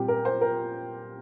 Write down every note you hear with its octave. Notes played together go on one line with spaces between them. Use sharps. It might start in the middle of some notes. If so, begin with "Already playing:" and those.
Already playing: A#2 G3 C4 G4
A#4
C5
A#4